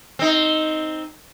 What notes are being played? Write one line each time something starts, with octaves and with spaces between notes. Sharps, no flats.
C4 D#4